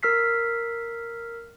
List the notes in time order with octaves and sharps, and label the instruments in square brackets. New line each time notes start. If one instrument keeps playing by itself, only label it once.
[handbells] A#4 E6 F6 B6 C7